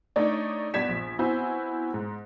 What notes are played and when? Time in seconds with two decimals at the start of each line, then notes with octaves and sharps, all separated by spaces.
0.16 A3 D4 D#4 C#5 D5
0.74 G2 B3 D5 G#6 B6 E7
0.89 A#1
1.19 B3 C4 E4 F#4 C5 G#5
1.94 G#2